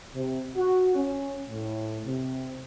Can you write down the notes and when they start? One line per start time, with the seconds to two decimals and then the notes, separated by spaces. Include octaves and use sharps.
0.15 C3
0.55 F#4
0.94 C#4
1.48 A2
2.05 C3